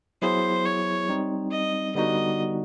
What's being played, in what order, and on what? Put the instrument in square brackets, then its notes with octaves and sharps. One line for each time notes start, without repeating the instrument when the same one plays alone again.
[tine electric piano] F#3 B3 E4 G#4 [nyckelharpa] C5
[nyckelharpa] C#5
[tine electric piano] G3 C4 D#4
[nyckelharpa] D#5
[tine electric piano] D3 G3 B3 D#4 F#4 [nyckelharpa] D#5